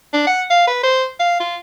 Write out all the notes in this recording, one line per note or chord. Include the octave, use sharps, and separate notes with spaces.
D4
F#5
F5
B4
C5
F5
F4